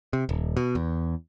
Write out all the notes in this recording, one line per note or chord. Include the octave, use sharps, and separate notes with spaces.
C3
D#1
B2
E2